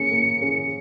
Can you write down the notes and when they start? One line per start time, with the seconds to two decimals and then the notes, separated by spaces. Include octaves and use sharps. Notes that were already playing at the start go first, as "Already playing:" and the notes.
Already playing: A#3 C#4 G#4 C#7
0.10 A#3
0.41 C#4 G#4